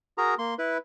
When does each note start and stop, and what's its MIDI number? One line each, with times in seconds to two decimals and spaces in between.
0.18 0.34 66
0.18 0.34 68
0.18 0.34 70
0.18 0.34 82
0.38 0.54 58
0.38 0.54 84
0.59 0.78 64
0.59 0.78 71